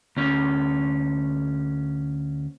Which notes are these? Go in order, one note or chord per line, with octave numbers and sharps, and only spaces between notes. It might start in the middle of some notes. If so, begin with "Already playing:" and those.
D2 C#4